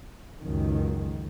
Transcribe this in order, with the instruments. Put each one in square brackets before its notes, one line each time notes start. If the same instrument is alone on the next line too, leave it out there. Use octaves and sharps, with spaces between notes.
[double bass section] C#2 F#2 D#3